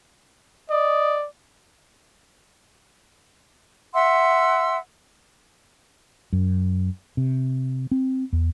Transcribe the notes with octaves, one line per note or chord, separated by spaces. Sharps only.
D5 D#5
E5 F#5 C6 E6
F#2
C3
C4
E2